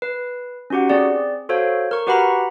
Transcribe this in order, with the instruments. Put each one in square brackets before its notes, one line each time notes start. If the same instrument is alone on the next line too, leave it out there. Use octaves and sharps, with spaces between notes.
[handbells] B4
C#4 D#4 F#4 G4 F#5
C4 G#4 D5
F#4 A4 C5 C#5 F5
A#4 C#6
F#4 G4 B4 F#5 A#5 B5